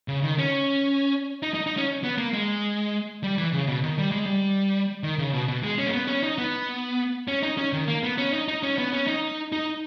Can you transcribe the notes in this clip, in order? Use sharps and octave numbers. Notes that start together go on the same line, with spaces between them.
C#3
D#3
C#4
D#4
D#4
D#4
C#4
B3
A#3
G#3
G3
E3
C#3
B2
D#3
G3
G#3
G3
D#3
C#3
B2
B2
G#3
C#4
A#3
B3
C#4
D#4
B3
C#4
D#4
C#4
D#3
A#3
B3
C#4
D#4
D#4
C#4
B3
C#4
D#4
D#4